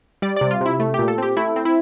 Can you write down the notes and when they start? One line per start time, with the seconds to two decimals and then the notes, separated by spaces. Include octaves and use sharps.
0.22 G3 D5
0.36 C3 D5
0.51 F4
0.61 C3 E4
0.80 A3
0.94 A#2 G4
1.08 A4
1.18 C4 G4
1.37 A3 E4
1.56 C4
1.65 E4